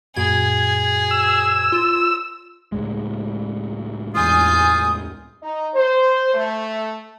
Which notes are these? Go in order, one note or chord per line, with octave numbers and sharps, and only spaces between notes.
F#2 A#2 F#4 G#4 G#6
E6
F4
C#2 A2 G#3
E2 F4 G#5 D#6 G6
D#4
C5
A3